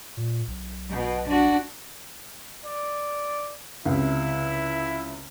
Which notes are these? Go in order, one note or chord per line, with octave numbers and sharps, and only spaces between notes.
A#2
B1
B2
D4 F#4
D5
C#2 C3 E4